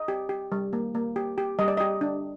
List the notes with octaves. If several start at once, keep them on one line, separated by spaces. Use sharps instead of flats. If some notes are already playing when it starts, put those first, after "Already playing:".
Already playing: D#5
G4
G4
G3
A#3
A#3
G4
G4
G3 D#5
D5
G4 D#5
D4